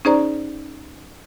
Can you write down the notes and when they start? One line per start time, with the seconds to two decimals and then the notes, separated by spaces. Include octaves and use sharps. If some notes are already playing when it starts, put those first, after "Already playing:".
0.05 C#4 D#4 G#4 C5 D5 A#5